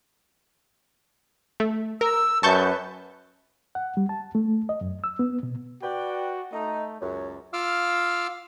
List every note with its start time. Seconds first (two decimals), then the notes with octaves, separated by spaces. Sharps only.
1.60 A3
2.01 A#4 E6
2.43 F#2 B4 A5 C#6 G6
3.75 F#5
3.97 G3
4.09 A5
4.35 A3
4.69 D#5
4.81 F#2
5.04 E6
5.19 B3
5.43 B2
5.82 F#4 B4 D5 G5
6.53 A3 D#4
7.01 C#2 F#2 C#5
7.53 F4 F5 D6 E6 F6